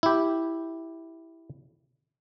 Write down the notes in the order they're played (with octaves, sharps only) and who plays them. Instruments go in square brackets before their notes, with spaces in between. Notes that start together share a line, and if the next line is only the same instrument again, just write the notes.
[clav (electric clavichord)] E4 G4